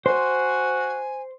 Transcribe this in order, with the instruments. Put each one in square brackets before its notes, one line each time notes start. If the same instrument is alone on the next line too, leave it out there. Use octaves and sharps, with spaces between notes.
[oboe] F#4 [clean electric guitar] C5 [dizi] G#5